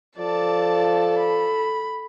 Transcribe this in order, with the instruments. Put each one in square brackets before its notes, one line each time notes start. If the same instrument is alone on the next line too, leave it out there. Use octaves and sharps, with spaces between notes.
[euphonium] F3 [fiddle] A4 [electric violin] D5 A5
[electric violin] B5